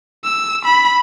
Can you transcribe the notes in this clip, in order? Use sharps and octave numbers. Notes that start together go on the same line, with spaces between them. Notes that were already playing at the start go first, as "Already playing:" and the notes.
E6
B5